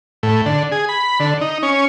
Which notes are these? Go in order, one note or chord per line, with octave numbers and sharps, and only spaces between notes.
A2
D3
G#4
B5
D3
D#4
C#4